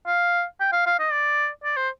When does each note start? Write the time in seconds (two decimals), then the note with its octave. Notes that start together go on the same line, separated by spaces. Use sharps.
0.07 F5
0.60 G5
0.72 F5
0.86 F5
0.99 D#5
1.12 D5
1.64 D5
1.77 C5